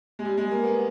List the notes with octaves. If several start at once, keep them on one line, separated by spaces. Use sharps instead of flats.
G#3
G3
G#3
A#3
B3